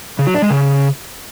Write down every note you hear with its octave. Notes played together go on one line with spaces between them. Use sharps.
C#3
F#3
D4
G#3
C#3